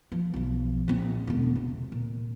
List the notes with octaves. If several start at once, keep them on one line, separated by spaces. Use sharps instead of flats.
F3
B1 F3
A#1 C4
E1 D2
C3
A#2